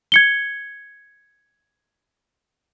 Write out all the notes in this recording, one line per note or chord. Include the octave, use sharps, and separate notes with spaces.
G#6 C#7 G7